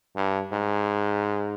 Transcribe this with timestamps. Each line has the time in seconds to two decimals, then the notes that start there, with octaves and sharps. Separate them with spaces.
0.16 G2
0.52 G#2